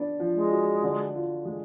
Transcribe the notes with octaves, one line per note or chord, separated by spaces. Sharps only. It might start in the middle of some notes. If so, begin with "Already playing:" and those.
Already playing: B3 D4
F3
G#3
F#4
D3
F4
G#3